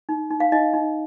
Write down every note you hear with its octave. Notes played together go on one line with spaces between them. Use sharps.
D#4
D#4
F5
D#4 D#5
D#4